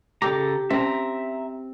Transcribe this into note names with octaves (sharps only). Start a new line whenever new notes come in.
C#3 G4 A4 A#5
C4 C#4 E5 A#5